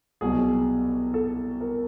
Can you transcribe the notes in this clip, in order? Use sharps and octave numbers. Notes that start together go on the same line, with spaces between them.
C2 B2 F#3 G#4
A4
A#4